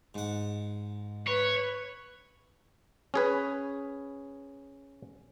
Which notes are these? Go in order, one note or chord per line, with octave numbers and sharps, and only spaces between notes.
G#2 F#5
B4 C#5
C#4 G#4 B4